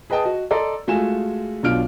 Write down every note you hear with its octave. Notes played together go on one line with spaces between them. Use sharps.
G#4 B4 D#5 G5 A5 D#6
F#4 D#5
A4 D5 D#5 A#5 C6
G#3 A3 F4 F#4 G#5 E7
B1 B2 D4 F4 F6 D7